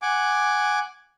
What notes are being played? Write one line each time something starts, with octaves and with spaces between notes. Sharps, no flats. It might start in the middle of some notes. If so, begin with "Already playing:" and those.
F#5 G#5 D6